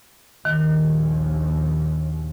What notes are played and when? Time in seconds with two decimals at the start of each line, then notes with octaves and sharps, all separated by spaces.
0.45 A#1 D#2 D#3